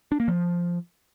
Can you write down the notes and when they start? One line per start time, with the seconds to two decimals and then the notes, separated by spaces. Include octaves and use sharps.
0.12 D4
0.20 A#3
0.28 F3